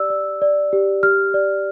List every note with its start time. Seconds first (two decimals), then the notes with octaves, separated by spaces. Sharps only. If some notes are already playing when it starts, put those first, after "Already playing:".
Already playing: G4 D5 E6
0.10 D5
0.42 D5
0.73 G4
1.03 G4 F6
1.34 D5